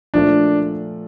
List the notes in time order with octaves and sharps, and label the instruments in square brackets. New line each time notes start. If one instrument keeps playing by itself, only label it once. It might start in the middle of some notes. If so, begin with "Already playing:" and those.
[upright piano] A#2 F3 A3 [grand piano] D4